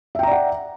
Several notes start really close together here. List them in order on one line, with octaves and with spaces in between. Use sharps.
E5 G5 A#5 D5 F#5